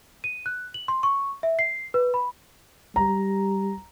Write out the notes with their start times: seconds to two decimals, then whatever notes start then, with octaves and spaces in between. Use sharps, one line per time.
0.24 D#7
0.46 F#6
0.74 F#7
0.88 C6
1.03 C#6
1.43 E5
1.59 C7
1.94 B4
2.14 B5
2.96 G3 A#5